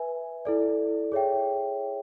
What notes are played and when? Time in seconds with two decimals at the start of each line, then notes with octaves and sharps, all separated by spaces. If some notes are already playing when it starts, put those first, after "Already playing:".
Already playing: B4 E5 G#5
0.45 E4 A4 D5
1.12 G#4 C#5 E5 G5